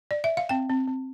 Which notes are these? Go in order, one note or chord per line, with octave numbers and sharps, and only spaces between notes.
D5
E5
F5
C4 G5
C4
C4